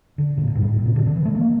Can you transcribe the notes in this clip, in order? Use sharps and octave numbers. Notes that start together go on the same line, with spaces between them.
D3
A#2
A2
G2
A2
A#2
C3
D3
D3
E3
A3
A#3